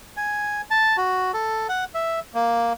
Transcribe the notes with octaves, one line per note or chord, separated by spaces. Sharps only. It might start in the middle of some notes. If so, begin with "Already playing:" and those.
G#5
A5
F#4
A4
F#5
E5
A#3